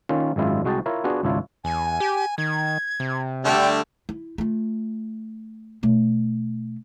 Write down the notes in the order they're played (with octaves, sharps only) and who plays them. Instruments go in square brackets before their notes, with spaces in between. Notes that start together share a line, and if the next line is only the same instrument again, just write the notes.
[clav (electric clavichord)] D#3 A#3 C#4 F4
G#1 F#2 G#3 E4 F4
C2 G#3 F#4 D#5 G5 A5
E4 F4 A#4 C#5
B3 D4 F4 F#4 G#4
G#1 C#2 D4 E4 F4 C#5
[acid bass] E2 [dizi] G#5
[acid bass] G4
[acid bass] D#3 [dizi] G#6
[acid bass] C3
[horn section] D3 G3 A3 [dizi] G5
[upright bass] E4
A3 F4
B2 A3